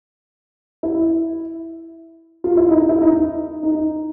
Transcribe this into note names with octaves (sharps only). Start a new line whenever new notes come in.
E4
F4
E4
D#4
E4
D#4
D#4